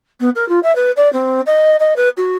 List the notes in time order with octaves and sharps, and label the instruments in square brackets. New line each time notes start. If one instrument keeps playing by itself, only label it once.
[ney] B3
A#4
F4
E5
B4
D5
C4
D#5
D#5
B4
F#4